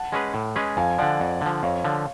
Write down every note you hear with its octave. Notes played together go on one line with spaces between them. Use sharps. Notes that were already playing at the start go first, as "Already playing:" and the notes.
Already playing: F#5 A5
G#3 C#4 G#4 B4
A2
G#3 C#4 G#4 B4
F2 F5 G#5
D3 F3 D5 F#5
F2
D3 F3
F2 C#5 F5
D3 F3